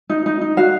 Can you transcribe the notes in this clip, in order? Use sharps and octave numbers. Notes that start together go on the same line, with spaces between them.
D#4
D#4
D#4
F#4 F5